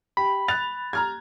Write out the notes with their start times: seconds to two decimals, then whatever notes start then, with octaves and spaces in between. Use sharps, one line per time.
0.17 G4 B5
0.48 F#6 A6 F7
0.93 A#5 F6 G#6